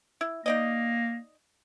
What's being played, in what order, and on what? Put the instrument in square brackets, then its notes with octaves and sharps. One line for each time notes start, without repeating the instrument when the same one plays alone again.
[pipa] E4
[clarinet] A#3 [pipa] D#4 D5 D#5